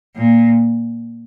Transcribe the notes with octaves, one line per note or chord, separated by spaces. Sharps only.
A#2